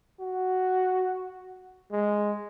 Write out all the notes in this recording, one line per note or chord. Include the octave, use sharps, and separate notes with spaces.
F#4
G#3